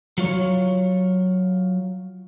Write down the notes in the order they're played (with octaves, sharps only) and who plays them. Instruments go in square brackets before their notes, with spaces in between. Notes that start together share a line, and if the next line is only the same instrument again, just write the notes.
[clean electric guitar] F#3 F4 C#5